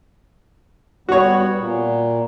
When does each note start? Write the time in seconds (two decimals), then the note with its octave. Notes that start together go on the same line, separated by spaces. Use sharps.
1.09 G3 B3 F#4 C#5
1.57 A#2